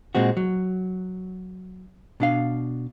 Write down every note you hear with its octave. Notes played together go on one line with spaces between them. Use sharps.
A#2 G#3 C4 F#4
F#3
B2 D4 F5